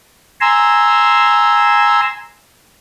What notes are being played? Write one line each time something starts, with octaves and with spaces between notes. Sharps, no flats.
G#5 A#5 C6 E6